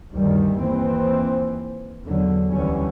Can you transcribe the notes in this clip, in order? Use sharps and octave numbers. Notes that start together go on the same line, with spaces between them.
D2 G2 D#3 G3
D#2 E3 C4
E2 D3 F#3
D2 D3 E3 G3 C#4